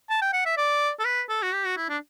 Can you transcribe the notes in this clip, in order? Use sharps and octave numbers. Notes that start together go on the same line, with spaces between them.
A5
G5
F#5
E5
D5
A4
B4
A4
F#4
G4
F#4
E4
D4